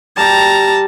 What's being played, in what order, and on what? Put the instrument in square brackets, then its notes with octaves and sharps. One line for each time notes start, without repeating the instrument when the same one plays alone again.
[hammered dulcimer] G3 G4 [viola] A5 A#5